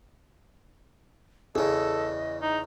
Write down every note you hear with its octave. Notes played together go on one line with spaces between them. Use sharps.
E2 C#3 G#4 A4 D#5
D#4 A#5